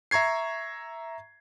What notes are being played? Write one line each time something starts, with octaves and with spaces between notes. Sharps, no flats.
E5 A#5 C#6 G#6 C7